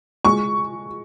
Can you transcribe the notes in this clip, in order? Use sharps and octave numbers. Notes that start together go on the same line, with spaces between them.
G#3 C#6